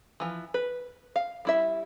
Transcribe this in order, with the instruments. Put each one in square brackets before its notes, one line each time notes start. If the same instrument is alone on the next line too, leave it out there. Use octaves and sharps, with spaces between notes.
[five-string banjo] E3 F3
B4
F5
G3 E4 E5